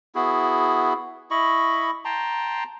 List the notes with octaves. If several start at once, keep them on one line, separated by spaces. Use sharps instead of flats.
B3 E4 F#4 G#4
E4 D#5 B5 C#6
G5 A5 A#5 C6